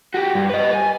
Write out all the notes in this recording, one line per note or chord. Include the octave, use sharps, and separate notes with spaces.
F#4 G4
G2
B4 D#5
G#5